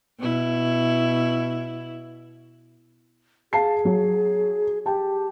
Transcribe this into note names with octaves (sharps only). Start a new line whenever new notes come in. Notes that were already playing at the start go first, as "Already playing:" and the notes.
B2 E4
G#4 F5 A5 C7
F#3
G4 G5 A5